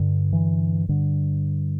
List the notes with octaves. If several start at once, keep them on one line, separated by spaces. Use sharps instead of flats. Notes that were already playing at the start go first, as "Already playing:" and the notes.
Already playing: G2 D3
E3
G2 D3